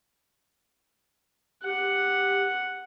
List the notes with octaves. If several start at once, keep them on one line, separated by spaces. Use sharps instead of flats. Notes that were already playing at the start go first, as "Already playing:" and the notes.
G4 F#5